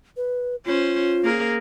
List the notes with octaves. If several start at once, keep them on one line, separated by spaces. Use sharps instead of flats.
B4
C#4 F4 C5
A#3 G#4 A#4